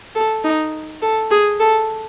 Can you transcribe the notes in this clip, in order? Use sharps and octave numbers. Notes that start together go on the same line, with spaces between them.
A4
D#4
A4
G#4
A4